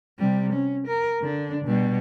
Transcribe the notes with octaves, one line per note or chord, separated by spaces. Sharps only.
C3 G3
C#4
A#4
D3 D4
B2 G3